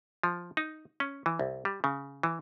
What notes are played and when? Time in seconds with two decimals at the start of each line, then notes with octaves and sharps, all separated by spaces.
0.23 F3
0.57 D#4
1.00 C#4
1.26 E3
1.39 C2
1.65 G3
1.84 C#3
2.23 E3